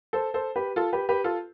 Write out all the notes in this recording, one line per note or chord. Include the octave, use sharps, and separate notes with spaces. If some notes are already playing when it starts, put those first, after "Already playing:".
A4 C5
A4 C5
G4 B4
F4 A4
G4 B4
G4 B4
F4 A4